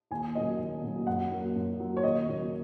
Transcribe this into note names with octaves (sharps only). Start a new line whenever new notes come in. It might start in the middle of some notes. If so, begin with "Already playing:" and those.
D#2 G#5
C#3 F#3 A#3 D#5
D#2
C#3 F#3 A#3
F#2 F#5
F#3 A#3
F#2
F#3 A#3
C#5
D#2 D#5
C#3 F#3 A#3